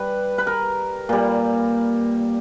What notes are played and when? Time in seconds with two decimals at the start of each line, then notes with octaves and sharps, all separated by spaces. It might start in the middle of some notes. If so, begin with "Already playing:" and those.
Already playing: G3 B4
0.38 B4
0.47 A#4
1.09 A#2 G3